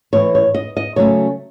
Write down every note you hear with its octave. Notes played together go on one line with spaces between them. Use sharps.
A2 E3 A3 C#5
C#5
D#5
D#5
C#3 F#3 A3 C#4 C#5